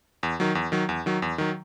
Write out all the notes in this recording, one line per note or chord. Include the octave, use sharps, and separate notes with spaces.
E2
D#3 F#3
E2
D#3 F#3
E2
D#3 F#3
E2
D#3 F#3